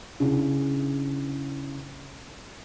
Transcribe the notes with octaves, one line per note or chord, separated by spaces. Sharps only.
C#3 D4 E4